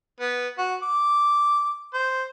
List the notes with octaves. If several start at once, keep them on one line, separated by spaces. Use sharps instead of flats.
B3
F#4
D6
C5